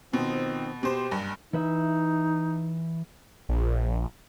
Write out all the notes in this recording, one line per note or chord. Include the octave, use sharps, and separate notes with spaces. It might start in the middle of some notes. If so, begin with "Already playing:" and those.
B2 D#3 F3 C4
B2 G4 C5
F#1 G2
E3 D#4 B4 E5
A#1